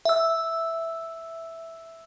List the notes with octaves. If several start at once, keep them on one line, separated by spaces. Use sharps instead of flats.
E5 E6